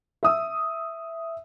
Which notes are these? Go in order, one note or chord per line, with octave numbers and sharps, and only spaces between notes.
E5 D#6 E6